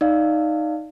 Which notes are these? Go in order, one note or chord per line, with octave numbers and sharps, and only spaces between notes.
D#4 D5 F5